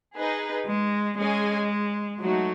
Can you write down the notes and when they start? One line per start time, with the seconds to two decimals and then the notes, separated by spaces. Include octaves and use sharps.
0.16 D#4 G#4 B4
0.66 G#3
1.17 G#3 C#4 G#4 D#5 G#5
2.20 F#3 A3 D#4 F#4